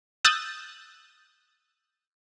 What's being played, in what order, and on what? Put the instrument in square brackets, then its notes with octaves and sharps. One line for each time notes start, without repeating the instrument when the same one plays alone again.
[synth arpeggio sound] D#6 E6 F#6 G6 A6